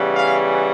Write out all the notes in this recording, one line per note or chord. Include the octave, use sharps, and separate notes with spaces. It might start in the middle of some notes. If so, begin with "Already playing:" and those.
Already playing: C#3 E3 G3 B3
F5